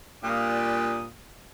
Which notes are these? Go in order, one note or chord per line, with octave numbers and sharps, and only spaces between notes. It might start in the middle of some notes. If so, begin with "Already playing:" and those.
A#2 G3 D4 D#6